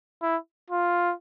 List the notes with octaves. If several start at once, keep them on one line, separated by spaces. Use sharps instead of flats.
E4
F4